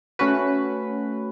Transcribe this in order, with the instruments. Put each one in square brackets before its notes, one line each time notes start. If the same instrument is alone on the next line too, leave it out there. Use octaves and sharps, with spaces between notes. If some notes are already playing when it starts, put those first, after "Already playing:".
[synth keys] A3 C#4 F#4 B4